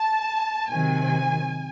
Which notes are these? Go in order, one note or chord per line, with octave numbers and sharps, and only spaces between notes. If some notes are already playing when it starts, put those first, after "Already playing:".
Already playing: A5
C3 D#3 F#3 G#5